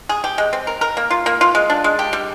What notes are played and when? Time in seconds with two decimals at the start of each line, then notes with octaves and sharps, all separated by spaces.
0.09 G#4
0.24 G4
0.38 G#3
0.53 C4
0.67 A#4
0.81 A#4
0.97 A#3
1.10 F4
1.26 A#3
1.41 F4
1.55 G#3
1.70 D4
1.84 G#3
1.99 G4
2.13 G3